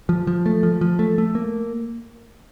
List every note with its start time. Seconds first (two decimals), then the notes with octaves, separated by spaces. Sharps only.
0.09 F3
0.27 F3
0.46 A3
0.63 F3
0.81 F3
0.99 A3
1.18 A3
1.35 A#3